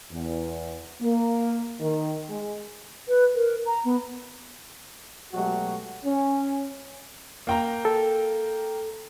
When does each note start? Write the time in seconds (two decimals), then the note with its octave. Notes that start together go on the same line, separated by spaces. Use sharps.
0.11 E2
1.01 A#3
1.80 D#3
2.29 G#3
3.08 B4
3.35 A#4
3.66 A#5
3.85 B3
5.34 B2 F#3 G#3 A3 F#4 G4
6.04 C#4
7.47 A#3 G5 A#5
7.85 A4